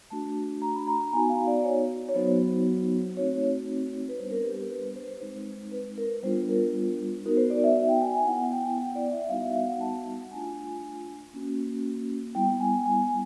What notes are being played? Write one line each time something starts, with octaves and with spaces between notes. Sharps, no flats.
A3 D4 F#4 A5
A#5
B5
A#5
A#5
B3 D#4 F#4 G#5
F5
D5
C#5
C#5
F#3 B3 D#4 F#4 C5
A3 C4 D#4 F#4 C#5
B4
G3 B3 D4 C5
A#4
G4
G4
B4
C5
G#3 C4 D#4 C5
B4
A#4
G3 B3 D4 F4 C5
A#4
B3 D#4 F#4 A#4
C5
D5
E5
E5
G5
G#5
G#5
B3 E4 F#5
G5
G5
D5
E5
G3 B3 D#4 F#4 F5
E5
F5
F#5
A5
A5
A3 D4 F4 G#5
A#3 C#4 F#4
G3 B3 E4 G5
G#5
G#5